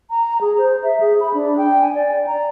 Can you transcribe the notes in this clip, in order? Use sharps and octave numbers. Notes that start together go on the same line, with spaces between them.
A#5
G#4
C5
E5
G#4
B5
D4
G5
G#5
D5
A#5